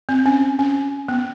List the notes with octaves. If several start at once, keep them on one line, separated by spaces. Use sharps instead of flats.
C4
C#4
C#4
B3